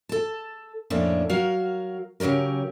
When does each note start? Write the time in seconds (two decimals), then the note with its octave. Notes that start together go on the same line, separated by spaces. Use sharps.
0.09 A4 A5
0.90 F2 A2 A#3 C#4 D4
1.29 F#3 F#4 A#4 F5
2.20 C#3 F#3 C#4 G4 A#4